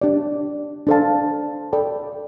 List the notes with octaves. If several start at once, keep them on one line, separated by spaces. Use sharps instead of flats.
D4 G4 D5
D4 A4 C5 F5 A5
A4 D5 G5 B5